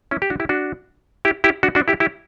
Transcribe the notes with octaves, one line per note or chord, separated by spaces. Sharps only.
C#4 E4
G4
D4 F#4
E4 G4
D4 F#4
E4 G4
E4 G4
D4 F#4
D4 F#4
E4 G4
E4 G4